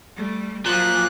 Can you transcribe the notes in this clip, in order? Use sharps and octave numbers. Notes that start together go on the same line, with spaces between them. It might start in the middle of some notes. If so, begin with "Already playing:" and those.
G3 A3
A#2 F3 F#3 F4 F#6